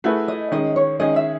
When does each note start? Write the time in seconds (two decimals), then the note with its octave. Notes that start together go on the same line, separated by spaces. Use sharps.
0.04 A3 E4 F#4 G#4 B4
0.28 D#5
0.52 D#3 G#3 C#4 D#5
0.76 C#5
1.00 D#3 G#3 C#4 G#4 D#5
1.16 E5